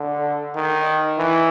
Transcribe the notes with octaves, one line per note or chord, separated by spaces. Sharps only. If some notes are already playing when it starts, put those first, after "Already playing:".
Already playing: D3
D#3
E3